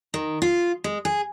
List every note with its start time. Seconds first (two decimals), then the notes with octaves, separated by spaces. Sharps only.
0.14 D#3
0.42 F4
0.84 G#3
1.05 G#4